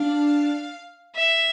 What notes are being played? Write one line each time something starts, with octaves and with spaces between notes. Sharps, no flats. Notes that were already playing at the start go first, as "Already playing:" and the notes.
Already playing: D4 F5
E5